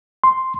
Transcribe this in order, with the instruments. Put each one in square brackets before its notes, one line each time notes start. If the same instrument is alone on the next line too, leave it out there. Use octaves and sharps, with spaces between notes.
[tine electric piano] C6